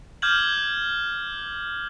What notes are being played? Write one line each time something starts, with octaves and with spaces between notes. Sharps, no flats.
D6 F6 G6 G#6 F#7